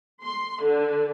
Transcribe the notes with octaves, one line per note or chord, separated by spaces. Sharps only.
C6
D3